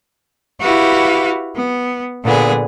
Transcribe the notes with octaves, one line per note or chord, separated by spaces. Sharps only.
E4 F#4 G4 B4 F5
B3
A#2 D3 B3 G#4